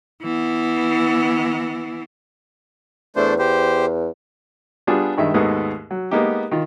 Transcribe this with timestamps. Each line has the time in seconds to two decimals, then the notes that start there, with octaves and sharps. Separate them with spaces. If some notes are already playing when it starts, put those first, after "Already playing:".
0.23 E3 B3
3.16 E2 A3 D4 C5
3.39 G4 C5
4.87 G3 B3 D4 F4 G#4
5.18 G2 D#3 G#3 E5
5.34 D#2 G#2 G#3 A3 B3 D#4
5.91 F#3
6.11 G#3 A#3 B3 D#4 G4
6.51 D#3 F4